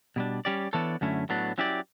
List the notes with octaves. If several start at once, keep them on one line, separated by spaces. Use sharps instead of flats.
B2 G3 D4
G3 C#4 G4 D5
E3 B3 D4 A4 C#5
F#2 D3 A3 C#4 E4
A2 F#3 B3 D4
F#3 C#4 E4 G4 D5